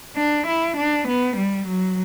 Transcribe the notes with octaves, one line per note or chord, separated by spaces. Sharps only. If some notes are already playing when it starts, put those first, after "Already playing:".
D4
E4
D4
B3
G3
F#3